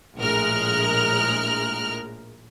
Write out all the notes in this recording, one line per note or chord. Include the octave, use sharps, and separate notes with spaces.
A#1 A2 G#3 A#4 F6 F#6